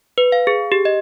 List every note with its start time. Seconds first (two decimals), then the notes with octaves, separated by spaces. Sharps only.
0.18 B4
0.32 F5
0.47 G#4
0.72 G4
0.85 D#5